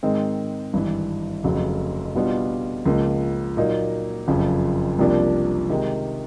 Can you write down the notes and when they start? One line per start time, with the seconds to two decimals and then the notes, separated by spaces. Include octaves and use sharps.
0.03 G#2 D#3 G#3 C4
0.73 G#1 G2 E3
1.44 F1 F2 C#3 F#3
2.15 B2 G3 B3 D4 F4
2.86 C#2 C#3 F3 A#3
3.57 A#2 F#3 A#3 D#4
4.28 F#1 F2 C#3 F3
4.99 C2 C3 F3 A#3 D4
5.69 C3 D#3 G#3